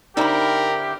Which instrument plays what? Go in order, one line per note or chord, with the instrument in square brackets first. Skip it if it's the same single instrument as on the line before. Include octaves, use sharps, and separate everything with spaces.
[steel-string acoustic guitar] D3 C4 E4 [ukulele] D#4 B5 [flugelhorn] G4 [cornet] A#4